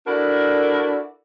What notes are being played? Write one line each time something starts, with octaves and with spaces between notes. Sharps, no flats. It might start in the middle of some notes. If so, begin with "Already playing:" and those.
D4 E4 F#4 A4 A#4 D5